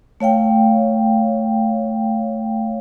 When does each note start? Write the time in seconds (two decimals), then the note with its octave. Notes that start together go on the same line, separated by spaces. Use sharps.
0.20 A3 C#5 F5 G5